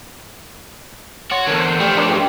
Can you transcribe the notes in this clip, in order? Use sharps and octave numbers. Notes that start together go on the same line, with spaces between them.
F#4 C#5 C6
E2 D3 A4 A#4
C5
F3 G3 A3
D4 A#4 C#5 E5
G2 C4 G4 C#5